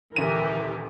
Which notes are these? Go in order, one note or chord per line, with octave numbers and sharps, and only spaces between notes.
D#1 D2 E3 G4 A#4 E5 D#7